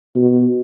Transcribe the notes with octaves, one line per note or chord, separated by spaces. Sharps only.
B2